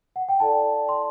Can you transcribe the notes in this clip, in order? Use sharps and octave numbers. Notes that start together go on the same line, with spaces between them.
F#5
G5
E4 A4 D5 A5
C6